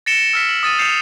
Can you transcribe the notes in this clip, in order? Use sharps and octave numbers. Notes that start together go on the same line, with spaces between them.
A6 A#6 C#7 D7 E7 G7
E6 F6 B6
F#7
D#6 A6 D#7
G6 C7 C#7 E7 F7